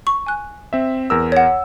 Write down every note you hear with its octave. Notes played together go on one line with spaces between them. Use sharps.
C#6
G#5 F#6
C4 E5
E2 A#4 E6
C#5 F#5